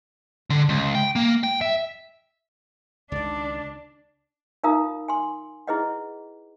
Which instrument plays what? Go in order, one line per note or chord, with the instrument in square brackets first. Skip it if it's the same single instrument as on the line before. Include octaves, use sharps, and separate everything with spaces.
[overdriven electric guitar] D3
C#2
G5
A#3
G5
E5
[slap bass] C#2 D#3 [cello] D4 [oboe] D5
[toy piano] D#4 F4 A#4 F5 A#5 D#6
G#5 C6
E4 G#4 B4 D#5 F#5